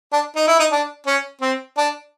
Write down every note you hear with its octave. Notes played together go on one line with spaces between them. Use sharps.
D4
D#4
E4
D#4
D4
C#4
C4
D4